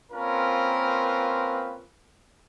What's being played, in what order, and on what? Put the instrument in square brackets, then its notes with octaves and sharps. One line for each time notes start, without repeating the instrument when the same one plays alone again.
[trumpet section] A#3 C4 C#4 F4 A#4 B4